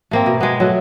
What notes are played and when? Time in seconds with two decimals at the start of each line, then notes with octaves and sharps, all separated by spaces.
0.11 A3 A#3 C4
0.26 B2
0.40 G#3 B3
0.60 F#3 A3